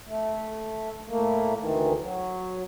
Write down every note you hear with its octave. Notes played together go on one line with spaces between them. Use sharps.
A3
A2 A3 A#3
D2 D#3 E3
F#3